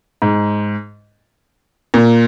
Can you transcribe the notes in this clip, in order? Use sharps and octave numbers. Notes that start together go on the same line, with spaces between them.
G#2
A#2